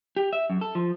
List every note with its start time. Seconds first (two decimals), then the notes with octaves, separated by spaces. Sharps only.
0.17 G4
0.33 E5
0.50 F#2
0.61 A4
0.75 F3